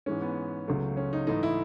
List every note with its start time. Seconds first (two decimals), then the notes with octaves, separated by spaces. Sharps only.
0.06 G#2 E3 G#3 C#4
0.22 B3
0.68 C#2 C#3 F#3 A3
0.97 C#4
1.13 D#4
1.27 G#2 E3 A3 D#4
1.43 E4